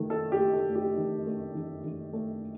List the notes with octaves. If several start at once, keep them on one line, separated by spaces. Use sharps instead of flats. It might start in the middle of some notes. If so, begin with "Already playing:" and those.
Already playing: D#3 A3
A3 A4
G4
A3
A4
A3
G4
D#3
A3
D#3
D#3
A3